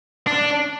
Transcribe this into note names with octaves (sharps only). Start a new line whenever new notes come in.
D4